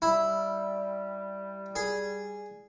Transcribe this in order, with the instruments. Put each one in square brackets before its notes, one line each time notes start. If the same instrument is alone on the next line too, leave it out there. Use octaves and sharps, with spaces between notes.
[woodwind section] G3 [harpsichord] E4
[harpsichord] G#4